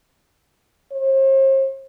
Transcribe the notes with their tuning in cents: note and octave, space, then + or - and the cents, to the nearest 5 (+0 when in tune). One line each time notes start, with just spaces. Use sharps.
C5 +45